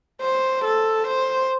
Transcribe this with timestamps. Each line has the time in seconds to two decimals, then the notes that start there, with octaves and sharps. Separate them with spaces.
0.21 C5
0.64 A4
1.07 C5